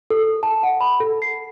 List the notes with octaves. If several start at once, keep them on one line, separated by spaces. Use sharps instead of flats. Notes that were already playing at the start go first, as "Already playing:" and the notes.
A4
A5
F#5
B5
A4
C7